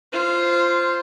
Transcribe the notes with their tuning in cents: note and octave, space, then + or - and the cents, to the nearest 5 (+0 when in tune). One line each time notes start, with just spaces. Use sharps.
F4 -15 C5 +0